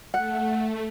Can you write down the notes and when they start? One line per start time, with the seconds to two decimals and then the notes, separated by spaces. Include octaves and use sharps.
0.14 A3 F#5